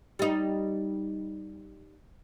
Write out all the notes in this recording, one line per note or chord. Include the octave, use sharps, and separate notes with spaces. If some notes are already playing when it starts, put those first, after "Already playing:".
G3 D#4